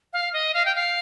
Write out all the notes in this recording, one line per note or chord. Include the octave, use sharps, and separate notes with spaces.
F5
D#5
F5
G5
F5